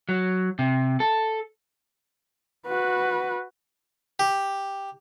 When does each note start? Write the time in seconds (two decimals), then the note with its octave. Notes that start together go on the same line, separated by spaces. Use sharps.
0.09 F#3
0.59 C3
1.00 A4
2.67 F#4 B4
4.19 G4